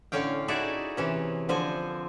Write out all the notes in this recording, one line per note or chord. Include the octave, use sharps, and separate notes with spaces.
A2 D3 C#4 F5 G5
D#4 E4 F#4 G#4 A4 D5
C3 E3 C#4
D3 F3 C4 G#5